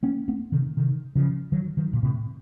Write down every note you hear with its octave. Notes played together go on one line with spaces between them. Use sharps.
A#3 C#4
A3 C4
C3 D#3
C3 D#3
C#3 F3
D#3 F#3
D#3 F#3
A#2
A2 C3